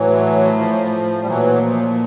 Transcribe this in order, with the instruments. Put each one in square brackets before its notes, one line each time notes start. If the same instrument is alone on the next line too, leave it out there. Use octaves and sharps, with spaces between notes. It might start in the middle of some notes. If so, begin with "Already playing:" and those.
Already playing: [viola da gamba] A2 [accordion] E3 F#3
[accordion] F3
G3
[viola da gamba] A#2 [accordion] E3 F#3
[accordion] F3
F3